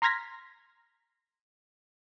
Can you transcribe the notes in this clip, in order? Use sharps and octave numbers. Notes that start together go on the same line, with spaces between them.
A#5 C6 F6 G#6 A#6 B6